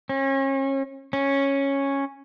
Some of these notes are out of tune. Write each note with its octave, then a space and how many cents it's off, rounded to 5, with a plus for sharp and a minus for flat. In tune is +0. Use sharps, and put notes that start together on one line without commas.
C#4 -35
C#4 -5